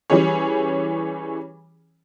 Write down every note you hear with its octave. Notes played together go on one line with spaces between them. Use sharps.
E3 G3 C#4 G#4 C#5